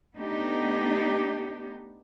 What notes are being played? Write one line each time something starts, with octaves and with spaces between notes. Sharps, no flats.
A3 B3 D4 D#4 G4